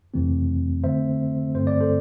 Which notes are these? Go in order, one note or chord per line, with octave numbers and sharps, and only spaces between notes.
F2 C3 E3 A3 C4
D3 A3 C4 C5 E5
G2 D3 A3 C4 C5
D5
A4 C5